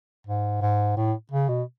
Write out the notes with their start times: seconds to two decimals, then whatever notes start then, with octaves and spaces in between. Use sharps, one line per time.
0.27 G#2
0.62 G#2
0.97 A2
1.31 C#3
1.49 B2